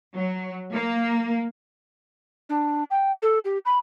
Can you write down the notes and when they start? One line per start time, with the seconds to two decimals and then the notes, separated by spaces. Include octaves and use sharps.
0.14 F#3
0.73 A#3
2.50 D4
2.91 G5
3.22 A4
3.45 G4
3.66 B5